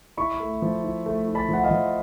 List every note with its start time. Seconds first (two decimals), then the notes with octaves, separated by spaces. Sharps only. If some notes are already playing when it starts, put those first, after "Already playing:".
0.17 E4 B5 C#6
0.40 A3
0.62 F3
0.84 E4
1.06 A3
1.28 E4
1.35 A5 B5
1.49 F3 F#5
1.64 D#5 F5
1.71 F3